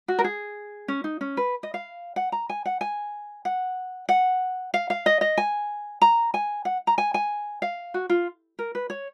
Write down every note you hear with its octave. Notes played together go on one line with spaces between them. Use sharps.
F#4
A#4
G#4
C#4
D#4
C#4
B4
D#5
F5
F#5
A#5
G#5
F#5
G#5
F#5
F#5
F5
F5
D#5
D#5
G#5
A#5
G#5
F#5
A#5
G#5
G#5
F5
F#4
F4
A#4
B4
C#5